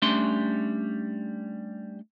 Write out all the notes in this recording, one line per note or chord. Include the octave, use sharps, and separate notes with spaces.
G3 A3 C#4 D4 C6